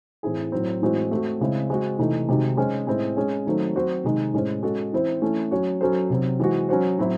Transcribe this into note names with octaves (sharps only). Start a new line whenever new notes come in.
A2 E3 C4 E4 G#4
A2 F#3 C4
A2 E3 G#3 C4 F#4
A3 C4 F#4
C#3 G#3 C4 E4
G#3 C4 F#4
C3 E3 A3 D#4
C3 D#3 G#3 D#4 F#4
G#3 C#4 G#4 C5
A2 G#3 C4 E4
G#3 C#4 G#4 C#5
D#3 F#3 A3 C4
F#3 C4 F#4 C5
C3 D#3 G#3 D#4
A2 G#3 C#4 G#4 C5
G#3 C#4 F#4 A4
E3 C4 E4 C5
E3 A3 C#4 E4
F#3 C#4 F#4 C#5
F#3 C#4 F#4 A4 C5
C3 F#3 C4
E3 G#3 C4 F#4
F#3 C#4 F#4 C5
A2 F#3 C4 E4